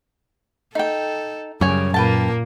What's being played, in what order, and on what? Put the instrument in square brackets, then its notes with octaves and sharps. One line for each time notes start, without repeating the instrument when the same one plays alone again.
[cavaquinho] D#4 G5 [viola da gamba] A4
[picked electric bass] F#2 [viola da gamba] C#3 G3 [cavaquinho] C#5 G#5
[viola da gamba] A#2 A#3 [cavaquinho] B4 G5 A5